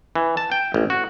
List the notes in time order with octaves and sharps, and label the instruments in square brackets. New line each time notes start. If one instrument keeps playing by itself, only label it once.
[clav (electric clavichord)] E3
A5
G5
A1
F#4